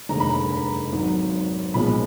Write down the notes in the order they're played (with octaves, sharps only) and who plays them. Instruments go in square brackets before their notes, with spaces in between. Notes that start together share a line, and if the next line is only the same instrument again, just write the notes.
[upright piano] F1 D#2 D3 G#3 A#5
B5
A#5
G#1 G#2 F#3
B1 A#2 F3 G#3 B5